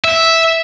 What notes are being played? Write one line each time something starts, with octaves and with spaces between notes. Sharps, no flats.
E5